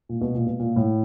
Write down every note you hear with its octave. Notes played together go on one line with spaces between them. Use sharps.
A#2
B2
A#2
B2
A#2
A2